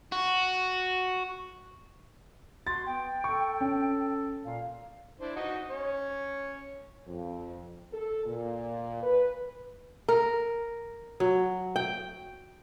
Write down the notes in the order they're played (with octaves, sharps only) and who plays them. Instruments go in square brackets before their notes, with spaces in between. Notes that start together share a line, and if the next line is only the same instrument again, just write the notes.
[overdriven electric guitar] F#4
[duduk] F#4 [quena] C6 [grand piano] A6
[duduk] B3 [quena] G5
[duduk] A4 [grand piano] C#6
[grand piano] C#4
[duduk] A#2 [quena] F5
[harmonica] D4 E4 C5
D#4 F#4 D#5
C#4 C#5
[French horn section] F2
A4
A#2
B4
[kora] A#4
F#3
G5